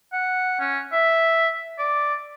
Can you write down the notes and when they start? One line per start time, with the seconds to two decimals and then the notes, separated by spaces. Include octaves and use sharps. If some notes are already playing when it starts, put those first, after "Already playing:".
0.13 F#5
0.60 C#4
0.92 E5
1.79 D5